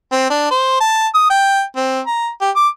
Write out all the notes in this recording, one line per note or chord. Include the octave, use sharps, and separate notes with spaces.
C4
D4
C5
A5
D#6
G5
C4
A#5
G4
D6